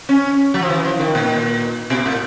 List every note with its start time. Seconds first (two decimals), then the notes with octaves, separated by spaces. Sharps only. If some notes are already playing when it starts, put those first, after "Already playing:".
0.09 C#4
0.54 F#3
0.62 F3
0.70 E3
0.85 F3
0.99 D#3
1.15 A#2
1.90 B2
2.06 A2